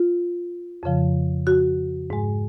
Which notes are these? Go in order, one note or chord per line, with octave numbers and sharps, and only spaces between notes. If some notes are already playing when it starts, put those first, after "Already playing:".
Already playing: F4
F2 C#3 F3
F#4
G#2 G#3